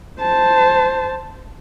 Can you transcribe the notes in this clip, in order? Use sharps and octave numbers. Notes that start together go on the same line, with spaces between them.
C5 A5